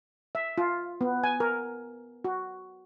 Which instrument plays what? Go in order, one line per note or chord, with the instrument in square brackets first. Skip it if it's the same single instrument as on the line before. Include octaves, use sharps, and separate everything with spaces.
[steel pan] E5
F4
B3
G#5
A#4
F#4